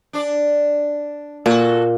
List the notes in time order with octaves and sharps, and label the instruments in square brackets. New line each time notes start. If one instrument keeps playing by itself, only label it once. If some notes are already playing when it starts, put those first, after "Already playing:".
[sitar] D4 D5
[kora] A#2 [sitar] F#4 A4